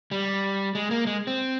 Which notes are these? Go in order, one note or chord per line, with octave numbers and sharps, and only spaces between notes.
G3
G#3
A#3
G#3
C4